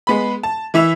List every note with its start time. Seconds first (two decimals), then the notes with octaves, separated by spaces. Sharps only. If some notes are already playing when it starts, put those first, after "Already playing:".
0.07 G#3 B3 B5
0.43 A5
0.74 E3 E4 E5 E6 F7